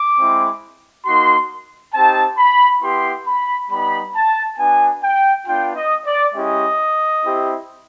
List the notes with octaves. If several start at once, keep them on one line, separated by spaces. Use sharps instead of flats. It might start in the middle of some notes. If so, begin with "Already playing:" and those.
Already playing: D6
G#3 C4 E4
A#3 D#4 F#4 C6
C4 D#4 G4 A5
B5
B3 E4 G4 C6
B5
G3 B3 D#4 B5
A5
B3 D4 F#4 G#5
G5
B3 D4 F4 G5
D#5
D5
G#3 C#4 E4 G4 D#5
C4 E4 G4